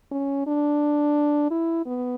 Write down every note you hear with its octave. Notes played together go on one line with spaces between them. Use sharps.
C#4
D4
E4
B3